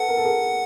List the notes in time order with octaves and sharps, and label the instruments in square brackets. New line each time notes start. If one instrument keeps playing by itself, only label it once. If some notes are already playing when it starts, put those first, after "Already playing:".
Already playing: [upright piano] A4 B4 [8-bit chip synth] F#5
[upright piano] A#4
A4
G#4 A#4